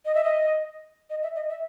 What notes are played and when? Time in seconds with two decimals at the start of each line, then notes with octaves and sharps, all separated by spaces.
0.05 D#5
0.15 E5
0.24 D#5
1.10 D#5
1.23 E5
1.36 D#5
1.49 E5